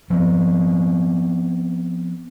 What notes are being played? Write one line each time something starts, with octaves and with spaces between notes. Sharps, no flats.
F3 B3 C4